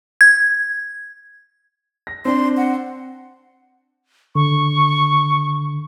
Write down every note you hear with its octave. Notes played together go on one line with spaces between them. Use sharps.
G#6
A#6
C4 D4 C6
F#5
D3 C#6